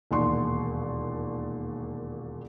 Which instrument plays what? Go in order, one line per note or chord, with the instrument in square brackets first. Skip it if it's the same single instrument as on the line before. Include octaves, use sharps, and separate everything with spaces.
[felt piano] E1 D#2 A#2 D5 C6 C#6